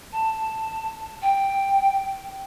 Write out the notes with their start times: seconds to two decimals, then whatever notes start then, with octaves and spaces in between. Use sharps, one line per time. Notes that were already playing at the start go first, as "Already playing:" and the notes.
0.12 A5
1.22 G5